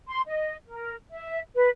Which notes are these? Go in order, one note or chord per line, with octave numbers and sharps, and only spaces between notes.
C6
D#5
A#4
E5
B4